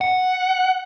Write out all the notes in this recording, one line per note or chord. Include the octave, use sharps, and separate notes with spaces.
F#5